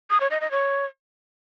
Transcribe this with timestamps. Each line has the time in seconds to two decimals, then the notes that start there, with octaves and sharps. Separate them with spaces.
0.10 D#6
0.20 C#5
0.31 D#5
0.41 D#5
0.51 C#5